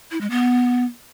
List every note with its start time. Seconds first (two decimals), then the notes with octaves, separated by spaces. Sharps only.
0.11 E4
0.21 G#3
0.31 B3